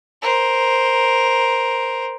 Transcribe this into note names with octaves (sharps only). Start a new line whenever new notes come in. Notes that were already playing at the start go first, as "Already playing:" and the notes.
A#4 C5